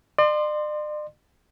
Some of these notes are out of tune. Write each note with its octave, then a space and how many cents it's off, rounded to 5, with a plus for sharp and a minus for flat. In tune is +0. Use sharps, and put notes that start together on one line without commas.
D5 +45 C6 +0